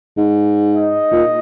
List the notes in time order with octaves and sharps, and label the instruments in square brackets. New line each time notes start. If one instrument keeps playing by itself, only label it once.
[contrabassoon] G#2
[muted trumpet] D#5
[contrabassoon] A#2